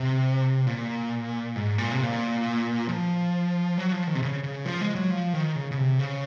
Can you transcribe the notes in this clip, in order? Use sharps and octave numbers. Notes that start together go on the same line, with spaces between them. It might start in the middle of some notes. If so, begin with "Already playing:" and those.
Already playing: C3
A#2
G#2
A#2
C3
A#2
F3
F#3
F3
D#3
C3
C#3
C#3
F3
G#3
F#3
F3
D#3
C#3
C#3
C3
C#3